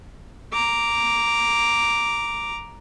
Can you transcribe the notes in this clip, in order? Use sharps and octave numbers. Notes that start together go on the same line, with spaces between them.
A#5 D6